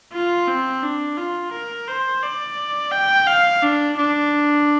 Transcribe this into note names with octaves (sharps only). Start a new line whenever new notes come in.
F4
C4
D4
F4
A#4
C5
D5
G5
F5
D4
D4